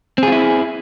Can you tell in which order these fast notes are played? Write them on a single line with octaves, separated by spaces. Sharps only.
C4 G#4 F4 E4